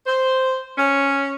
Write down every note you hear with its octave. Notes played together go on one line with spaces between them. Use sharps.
C5
C#4